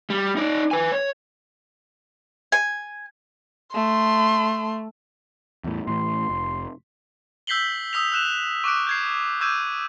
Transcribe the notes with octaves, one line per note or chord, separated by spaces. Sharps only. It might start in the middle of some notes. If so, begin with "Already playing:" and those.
G3
D#4 D5
B4 G#5
C#5
G#5
A3 C6
E2 A2
A2 E3 C6
F1
E6 G6 B6 C7 F#7 G7
D#6 E6 B6 F7
E6 F#6 E7 F7
C#6 D6 F#6 D7
G6 G#6 C7
C#6 D6 E6 G6 G#6 D#7